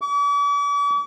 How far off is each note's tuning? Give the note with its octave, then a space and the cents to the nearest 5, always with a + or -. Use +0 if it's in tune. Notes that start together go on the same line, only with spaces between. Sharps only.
D6 -45